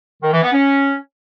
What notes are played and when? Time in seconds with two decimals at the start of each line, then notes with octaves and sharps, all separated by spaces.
0.22 D#3
0.33 E3
0.43 B3
0.53 C#4